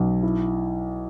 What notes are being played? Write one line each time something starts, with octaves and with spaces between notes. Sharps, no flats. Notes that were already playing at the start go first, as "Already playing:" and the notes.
Already playing: B1
E4